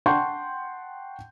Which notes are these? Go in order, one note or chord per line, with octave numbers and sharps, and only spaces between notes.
F#5 G5 A5 C6 C#6 G6